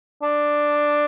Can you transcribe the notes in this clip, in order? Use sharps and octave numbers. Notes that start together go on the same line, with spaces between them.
D4